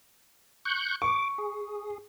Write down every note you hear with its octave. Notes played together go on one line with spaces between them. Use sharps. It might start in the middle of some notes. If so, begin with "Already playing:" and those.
C#6 F#6 G6
C#6 D6
G#4